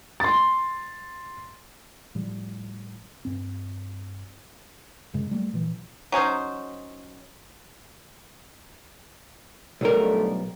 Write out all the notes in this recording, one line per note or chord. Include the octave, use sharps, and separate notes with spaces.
C6 A6
A2 F3 G3
G2 C4
F#2 C#3 G#3
G3 A3 A#3
A#2 E3 F3
F#3 C#4 D#4 C5
B1 D3 F3 G3 A3 A#4